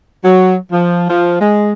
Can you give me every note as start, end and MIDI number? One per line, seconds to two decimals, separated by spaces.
0.24 0.55 54
0.72 1.05 53
1.09 1.39 53
1.40 1.72 56